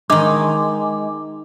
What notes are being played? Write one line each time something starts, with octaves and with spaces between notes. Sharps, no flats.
D#3 G#3 D#4 D6